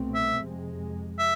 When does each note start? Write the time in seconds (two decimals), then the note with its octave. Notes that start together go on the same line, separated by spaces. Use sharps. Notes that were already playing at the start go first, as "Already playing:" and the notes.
Already playing: C2 B2 A3 C4
0.15 E5
0.41 F2 C3 G#3
1.19 E5